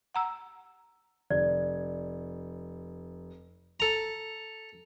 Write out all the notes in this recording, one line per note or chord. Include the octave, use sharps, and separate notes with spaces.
F#5 A#5 E6
F1 D5
A4 A#5